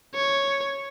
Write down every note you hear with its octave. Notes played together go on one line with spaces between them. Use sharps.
C#5